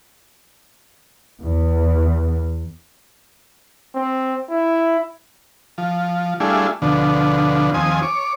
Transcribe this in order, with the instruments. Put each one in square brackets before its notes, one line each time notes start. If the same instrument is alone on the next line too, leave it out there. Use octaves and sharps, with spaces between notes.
[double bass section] E2
[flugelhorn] C4
E4
[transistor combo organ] F3
G3 A3 D4 E4 F4 G#4
D2 B2 D3 F3
D#2 F3 C4 G#5 D#6
C#5 D6